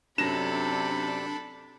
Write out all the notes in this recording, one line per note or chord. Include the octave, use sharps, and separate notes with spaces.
F#2 C3 D4 A4 B5 A#6 E7